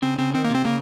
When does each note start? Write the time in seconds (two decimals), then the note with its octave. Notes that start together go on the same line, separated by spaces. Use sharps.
0.02 C#3 C4
0.18 C#3 C4
0.34 D#3 C4
0.45 A#3
0.50 C3
0.55 C4
0.65 C#3 A#3